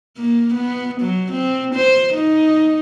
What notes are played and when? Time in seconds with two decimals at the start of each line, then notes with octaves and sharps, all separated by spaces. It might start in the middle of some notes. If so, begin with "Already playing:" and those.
0.17 A#3
0.54 B3
1.01 F#3
1.32 C4
1.75 C5
2.14 D#4